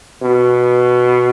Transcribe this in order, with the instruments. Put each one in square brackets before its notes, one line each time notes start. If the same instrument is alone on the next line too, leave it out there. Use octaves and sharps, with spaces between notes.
[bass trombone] B2